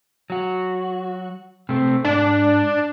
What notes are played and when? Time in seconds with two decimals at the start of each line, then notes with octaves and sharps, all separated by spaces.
0.30 F#3 F#4
1.69 C3 A3 C4
2.05 G#2 D4